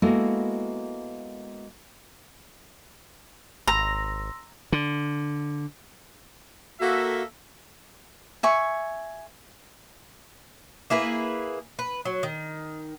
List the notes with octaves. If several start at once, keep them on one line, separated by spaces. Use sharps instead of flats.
G#3 A#3 B3 E4 F#4 A4
G#1 A#5 C6 E6 A#6
D3
A#3 F#4 A4 E5
E5 G#5 C#6
A#3 E4 G#4 B4
B4
F#3
D#3